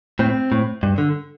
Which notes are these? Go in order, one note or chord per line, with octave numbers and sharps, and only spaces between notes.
A2 C4
A2
G2
D3